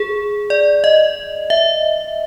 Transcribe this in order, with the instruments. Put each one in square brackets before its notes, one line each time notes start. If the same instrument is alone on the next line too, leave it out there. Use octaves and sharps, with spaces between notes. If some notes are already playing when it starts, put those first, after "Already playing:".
Already playing: [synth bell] G#4
D5
D#5
E5